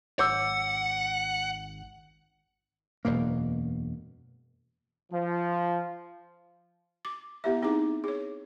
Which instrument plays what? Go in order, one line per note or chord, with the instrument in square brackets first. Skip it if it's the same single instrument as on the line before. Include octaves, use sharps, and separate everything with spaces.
[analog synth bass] G#1 [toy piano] C#5 D6 E6 [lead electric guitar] F#5
[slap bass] E1 F#2 B2 A#3
[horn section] F3
[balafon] D6
B3 E4 G4 E5
C4 D#4 E4 G#4 D6
G#4 C#5